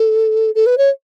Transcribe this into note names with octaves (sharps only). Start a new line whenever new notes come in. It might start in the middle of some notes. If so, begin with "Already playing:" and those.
Already playing: A4
A4
B4
C#5